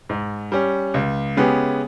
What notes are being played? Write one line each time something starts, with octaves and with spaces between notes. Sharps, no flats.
G#2
G3 C#4
C#2
C#3 G#3 B3 G4